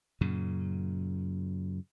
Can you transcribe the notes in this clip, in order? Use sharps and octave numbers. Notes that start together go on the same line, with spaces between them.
F#2 A#2 C#3